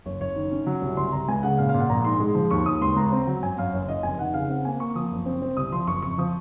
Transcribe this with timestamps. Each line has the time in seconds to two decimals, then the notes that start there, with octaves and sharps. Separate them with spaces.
0.06 F#1 C#5
0.20 F#1 C#5
0.36 D#3
0.51 C#4
0.67 F#3
0.82 C2
0.97 C2 C6
1.12 C2 A#5
1.28 C#2 G#5
1.43 C#3 F#5
1.58 A#2 F5
1.69 F5
1.74 A#2 F#5
1.89 A#1 A#5
2.04 G#2 C6
2.20 G#3
2.35 F3
2.51 D#2 C#6
2.66 D#2 D#6
2.81 C#2 C6
2.96 C#2 A#5
3.12 C4
3.27 F#3
3.42 F#2 G#5
3.58 F#2 F5
3.73 F#1 C#5
3.89 F#1 D#5
4.03 F1 G#5
4.19 D#3 F#5
4.34 C#3 F5
4.49 C4 F#5
4.65 A#3 G#5
4.80 A#3 C#6
4.95 F3 D#6
5.11 F#1
5.26 C4
5.42 C4
5.57 C2 D#6
5.72 F3 C6
5.87 F#1 C#6
6.02 F2 C#6
6.18 F3 D#6